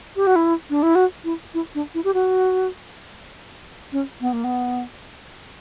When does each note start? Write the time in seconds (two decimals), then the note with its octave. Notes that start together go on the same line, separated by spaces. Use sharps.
0.16 G4
0.27 F#4
0.36 E4
0.70 D4
0.83 E4
0.95 F#4
1.24 E4
1.54 E4
1.75 D4
1.94 E4
2.04 G4
2.14 F#4
3.92 C#4
4.21 B3
4.33 A#3
4.44 B3